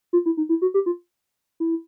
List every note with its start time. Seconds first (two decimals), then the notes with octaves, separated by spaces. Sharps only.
0.13 F4
0.26 E4
0.37 D#4
0.49 E4
0.62 F#4
0.74 G4
0.86 F4
1.60 E4